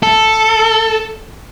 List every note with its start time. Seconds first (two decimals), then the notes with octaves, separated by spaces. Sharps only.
0.03 A4